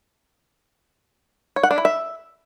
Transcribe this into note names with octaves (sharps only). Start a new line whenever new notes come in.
C#5
F#5
D4
E4
E5